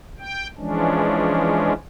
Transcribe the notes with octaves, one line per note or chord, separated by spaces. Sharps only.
G5
E3 F3 G#3 C#4 D4